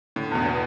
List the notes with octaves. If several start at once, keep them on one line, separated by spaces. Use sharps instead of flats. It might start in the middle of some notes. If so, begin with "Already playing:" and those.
A2 D3
E2 B2
B3